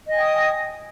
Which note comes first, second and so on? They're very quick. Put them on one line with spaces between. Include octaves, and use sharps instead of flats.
D#5 G#5 G5 D#6